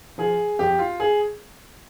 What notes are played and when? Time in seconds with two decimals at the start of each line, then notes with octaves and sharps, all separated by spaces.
0.18 F3 G#4
0.59 F2 G4
0.79 F4
1.00 G#4